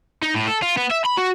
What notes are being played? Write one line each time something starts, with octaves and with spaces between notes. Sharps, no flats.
D#4
A2
A4
F4
B3
E5
B5
F#4